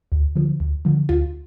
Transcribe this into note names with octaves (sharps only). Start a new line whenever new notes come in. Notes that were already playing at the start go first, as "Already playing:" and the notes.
D2
D3 F3
D2
D3 F3
D2 F4